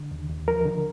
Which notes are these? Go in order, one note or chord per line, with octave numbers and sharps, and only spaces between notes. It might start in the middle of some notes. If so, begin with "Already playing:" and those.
Already playing: D3
D#2
D#2
F3 A#4
D3